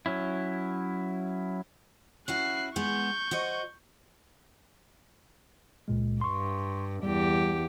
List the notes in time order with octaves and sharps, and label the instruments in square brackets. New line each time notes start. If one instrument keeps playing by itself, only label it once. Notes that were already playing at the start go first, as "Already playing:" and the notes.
[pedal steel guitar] F#3 C#4 E4
[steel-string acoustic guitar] C#4 E4 F#4 [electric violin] F#6 C7
[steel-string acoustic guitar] G#3 B3 [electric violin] C#6 G6
[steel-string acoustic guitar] F#4 C5 D#5
[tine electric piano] C#2 A#2 G#3
[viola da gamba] G2 [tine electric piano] C6 C#6
[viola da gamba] E2 G4 [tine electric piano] G3